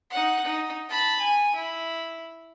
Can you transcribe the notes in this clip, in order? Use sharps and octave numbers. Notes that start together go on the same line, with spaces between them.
D#4 F#5
D#4
A5 B5
G#5
E4